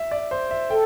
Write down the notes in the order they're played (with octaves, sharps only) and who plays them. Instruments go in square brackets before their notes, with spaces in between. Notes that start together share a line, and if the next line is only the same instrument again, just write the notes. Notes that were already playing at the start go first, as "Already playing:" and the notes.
Already playing: [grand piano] E5
D5
C5
E5
[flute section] A4 [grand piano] G5